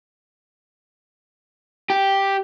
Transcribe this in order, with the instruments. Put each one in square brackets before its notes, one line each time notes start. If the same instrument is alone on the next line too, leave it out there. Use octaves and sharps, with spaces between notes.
[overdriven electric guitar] G4